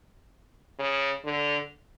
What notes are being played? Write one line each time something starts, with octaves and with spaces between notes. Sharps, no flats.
C#3
D3